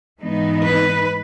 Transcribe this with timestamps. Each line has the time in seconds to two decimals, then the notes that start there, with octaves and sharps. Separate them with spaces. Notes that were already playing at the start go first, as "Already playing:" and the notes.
0.20 G#2 E3 B3 D#4
0.66 B4